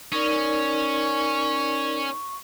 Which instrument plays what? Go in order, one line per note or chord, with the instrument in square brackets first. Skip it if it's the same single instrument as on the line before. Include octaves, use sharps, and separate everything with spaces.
[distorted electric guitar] C#4 [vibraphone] D#4 A#4 D5 [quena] C#6